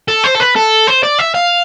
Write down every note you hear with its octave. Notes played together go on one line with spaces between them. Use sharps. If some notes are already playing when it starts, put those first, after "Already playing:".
A4
C5
A4
B4
A4
C5
D5
E5
F5